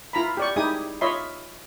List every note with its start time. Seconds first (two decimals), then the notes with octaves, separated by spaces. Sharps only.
0.13 E4 F4 A#5 B5
0.37 G4 D5 C#6
0.56 D#4 E4 G4 G#4 G#5 D#6
1.01 F4 C#5 D#5 E5 B5 C6